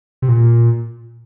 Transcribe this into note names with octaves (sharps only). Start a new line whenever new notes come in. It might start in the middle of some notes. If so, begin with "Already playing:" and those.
C3
A#2